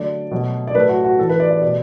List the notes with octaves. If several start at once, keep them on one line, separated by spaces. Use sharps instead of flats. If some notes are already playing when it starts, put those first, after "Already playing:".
Already playing: D3 F#3 A3 D5
B2 F#3 A3
D5
A2 F#3 A3 B4
F#4
F#4
A2 E3 A3 A4
B4
D5
D5
B2 A3 D5